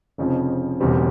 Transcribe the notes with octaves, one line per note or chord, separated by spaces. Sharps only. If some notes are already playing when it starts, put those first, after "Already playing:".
F1 F2 C#3 F3
E1 E2 C#3 G3 C4